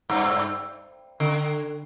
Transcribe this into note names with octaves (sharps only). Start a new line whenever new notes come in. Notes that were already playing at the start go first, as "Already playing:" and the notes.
G2
D3